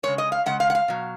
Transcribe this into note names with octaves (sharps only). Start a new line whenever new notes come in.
C#3 G#3 C#5
D#5
F5
C#3 G#3 F#5
F5
F#5
F5
B2 F#3